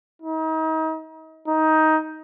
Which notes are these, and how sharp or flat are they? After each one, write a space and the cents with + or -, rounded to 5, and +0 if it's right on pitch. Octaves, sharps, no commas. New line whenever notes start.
D#4 +35
D#4 +15